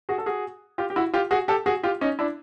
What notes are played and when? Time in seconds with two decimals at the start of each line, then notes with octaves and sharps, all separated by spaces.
0.09 F#4 G#4
0.18 A4
0.26 F#4 G#4
0.78 F4 G4
0.90 G4
0.96 E4 F#4
1.14 F4 G4
1.31 F#4 G#4
1.48 G4 A4
1.66 F#4 G#4
1.83 F4 G4
2.01 C#4 D#4
2.19 D4 E4